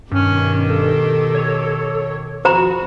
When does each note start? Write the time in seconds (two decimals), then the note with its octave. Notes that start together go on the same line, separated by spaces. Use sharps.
0.11 G2 B2 D#3 C#4 G4
0.69 A4
1.35 C#5
2.45 F2 F#4 C5 A#5 B5